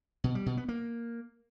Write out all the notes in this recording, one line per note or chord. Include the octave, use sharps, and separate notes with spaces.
B2
G3
B2
B3
A#3